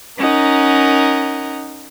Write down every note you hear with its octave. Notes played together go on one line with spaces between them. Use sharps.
C#4 D#4 A#4 F#5